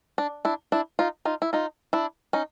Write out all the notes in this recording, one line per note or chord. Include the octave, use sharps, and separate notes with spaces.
D4
D4 E4
D4 E4
D#4 F4
D#4 F4
E4
D#4 F4
D4 E4
C#4 D#4